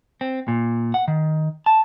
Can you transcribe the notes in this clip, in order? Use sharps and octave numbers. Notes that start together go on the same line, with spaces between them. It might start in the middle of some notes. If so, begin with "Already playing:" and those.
C4
A#2
F#5
D#3
A5